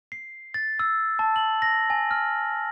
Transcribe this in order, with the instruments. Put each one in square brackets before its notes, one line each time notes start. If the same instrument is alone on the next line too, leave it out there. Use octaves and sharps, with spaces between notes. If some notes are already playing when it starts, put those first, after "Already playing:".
[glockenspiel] C7
A6
E6
A5
F#7
A#6
G#5
F6